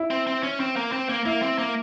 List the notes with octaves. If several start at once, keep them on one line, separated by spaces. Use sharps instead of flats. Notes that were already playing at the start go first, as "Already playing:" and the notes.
Already playing: E4
C4
C4
C#4
C4
A#3
C4
A#3
A#3 E4
C4
A#3